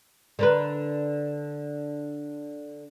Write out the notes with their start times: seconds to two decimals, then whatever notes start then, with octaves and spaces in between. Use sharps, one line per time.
0.39 D3 A#4 B4